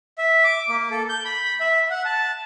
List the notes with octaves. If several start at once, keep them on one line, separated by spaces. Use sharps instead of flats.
E5
D6
A#3
A4
G6
B5
B5
E5
F#5
A5